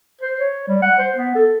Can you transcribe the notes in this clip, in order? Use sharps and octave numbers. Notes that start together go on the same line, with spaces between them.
C5
C#5
G3
F#5
C5
B3
A4